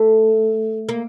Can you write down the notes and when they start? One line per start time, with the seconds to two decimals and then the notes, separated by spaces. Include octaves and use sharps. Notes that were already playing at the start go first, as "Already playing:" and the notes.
Already playing: A3
0.89 A#3